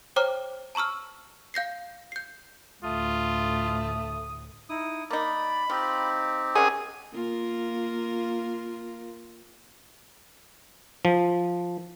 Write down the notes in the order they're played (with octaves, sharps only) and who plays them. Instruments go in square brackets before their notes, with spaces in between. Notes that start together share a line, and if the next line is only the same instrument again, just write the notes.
[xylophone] C5 C#5 G5 A#5 D6 F6
A5 A#5 C#6 E6 F6
F5 G6 A#6 C7
G6 C7
[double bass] D2 A2 [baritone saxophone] A3 [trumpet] F4 [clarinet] D#6
[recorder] D#4 [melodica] E4 D#6
[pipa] A#3 D#4 [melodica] D5 [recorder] B5
[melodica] C4 D#4 G4 [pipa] F4
[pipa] D#3 C#4 [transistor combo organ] G#4 [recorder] F#5
[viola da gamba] A#3 F4 A#4
[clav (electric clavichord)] F3